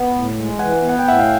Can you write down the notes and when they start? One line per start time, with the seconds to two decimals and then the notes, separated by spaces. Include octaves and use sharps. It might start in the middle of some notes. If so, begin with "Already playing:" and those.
Already playing: B3
0.14 A2
0.37 G#3
0.59 E3 F#5 G#5
0.82 B3
0.89 F#5
0.99 G5
1.05 A2 E5 F#5
1.19 F5 G5